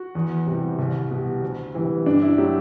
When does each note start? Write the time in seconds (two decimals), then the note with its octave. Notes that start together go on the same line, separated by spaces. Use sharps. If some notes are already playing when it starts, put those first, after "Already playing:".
Already playing: F#4
0.15 E2
0.47 C3 E3 G3
0.79 C2
1.11 B2 G3
1.42 D2
1.74 C3 E3 G3
2.06 G2 D4
2.22 E4
2.38 D3 F#3 A3 G4